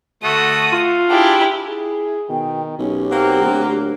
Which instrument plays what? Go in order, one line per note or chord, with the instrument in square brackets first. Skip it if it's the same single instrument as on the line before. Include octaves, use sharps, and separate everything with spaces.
[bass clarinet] D3 [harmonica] A3 F#4 [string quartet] D#6
[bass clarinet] F4
[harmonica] D4 G#4 [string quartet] E4 G4
[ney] E4 [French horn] G#4
[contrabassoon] B2 [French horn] D#3 [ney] G5
[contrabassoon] B1 [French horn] C#4 [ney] G4
[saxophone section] F#3 A#3 [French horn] C4
[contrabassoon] D2